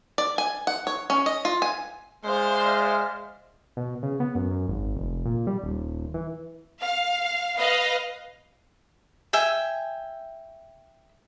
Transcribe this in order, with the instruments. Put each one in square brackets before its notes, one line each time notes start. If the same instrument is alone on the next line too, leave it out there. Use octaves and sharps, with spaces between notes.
[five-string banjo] D5
G#5
F#5
C#5
C#4
D#5
F4
G#5
[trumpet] G#3 [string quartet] C5 F5 [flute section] D5 E5 F6
[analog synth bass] B2
C#3
B3
F#2
F#2
G#1
F1
A#2
G3
D#1
E3
[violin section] F5
B4 D#5 F5
[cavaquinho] E5 G5 G#5